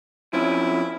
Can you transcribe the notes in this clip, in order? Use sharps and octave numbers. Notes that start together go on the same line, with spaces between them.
F3 C4 C#4 E4